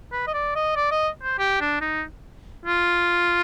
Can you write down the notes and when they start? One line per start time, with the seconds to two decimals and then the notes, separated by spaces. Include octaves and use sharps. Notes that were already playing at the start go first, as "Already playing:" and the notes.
0.12 B4
0.27 D#5
0.34 D5
0.55 D#5
0.76 D5
0.91 D#5
1.23 C5
1.39 G4
1.61 D4
1.81 D#4
2.66 F4